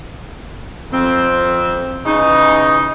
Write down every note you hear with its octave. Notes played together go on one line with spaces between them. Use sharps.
F2 C4
C#3 E3 D#4